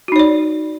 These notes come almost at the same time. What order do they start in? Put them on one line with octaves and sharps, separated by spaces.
F#4 D#4 C#5 D5